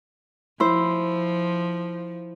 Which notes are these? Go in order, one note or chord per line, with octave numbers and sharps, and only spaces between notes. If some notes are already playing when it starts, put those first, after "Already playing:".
F3 E4 C5